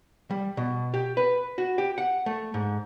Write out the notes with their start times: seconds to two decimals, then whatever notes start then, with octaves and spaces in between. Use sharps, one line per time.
0.30 G3
0.57 B2
0.94 G4
1.17 B4
1.58 F#4
1.78 G4
1.98 F#5
2.26 A3
2.54 G#2